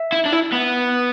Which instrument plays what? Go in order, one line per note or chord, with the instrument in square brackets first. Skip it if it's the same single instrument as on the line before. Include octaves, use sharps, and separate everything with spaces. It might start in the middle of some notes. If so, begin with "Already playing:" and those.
Already playing: [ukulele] E5
[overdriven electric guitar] E4
D4
E4
B3